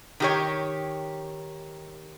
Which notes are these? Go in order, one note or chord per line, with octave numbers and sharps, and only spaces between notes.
D#3 G4 C#5